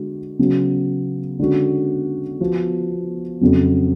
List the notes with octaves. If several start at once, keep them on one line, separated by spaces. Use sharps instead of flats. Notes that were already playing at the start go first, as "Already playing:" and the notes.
Already playing: D3 G#3 F#4
C#3 F#3 B3
D3 G#3 C#4 F#4
F3 B3 F#4
F2 C#3 F#3